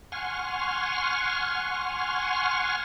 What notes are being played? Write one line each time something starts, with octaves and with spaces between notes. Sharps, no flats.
F#5 G#5 C6 C#6 F6